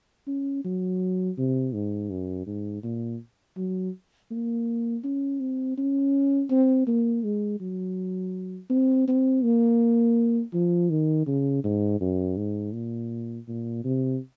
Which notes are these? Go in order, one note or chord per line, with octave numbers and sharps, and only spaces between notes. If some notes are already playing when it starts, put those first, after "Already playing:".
C#4
F#3
C3
G#2
F#2
G#2
A#2
F#3
A#3
C#4
C4
C#4
C4
A#3
G#3
F#3
C4
C4
A#3
F3
D#3
C#3
G#2
F#2
G#2
A#2
A#2
C3